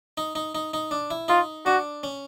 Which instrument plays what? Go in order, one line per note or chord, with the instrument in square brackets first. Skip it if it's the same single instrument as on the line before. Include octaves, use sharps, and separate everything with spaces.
[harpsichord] D#4
D#4
D#4
D#4
D4
E4
[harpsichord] D#4 [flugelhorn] F4
[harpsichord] D4 [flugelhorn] F#4
[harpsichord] C#4